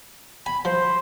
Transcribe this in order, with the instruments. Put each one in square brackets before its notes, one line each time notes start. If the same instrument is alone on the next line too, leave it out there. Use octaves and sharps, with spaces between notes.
[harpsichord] G#5 [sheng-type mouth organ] B5
[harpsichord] F3 [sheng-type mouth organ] C5